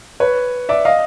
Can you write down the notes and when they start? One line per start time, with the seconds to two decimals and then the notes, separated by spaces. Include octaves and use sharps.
0.20 B4 C#5
0.69 D5 E5
0.85 D#5 F5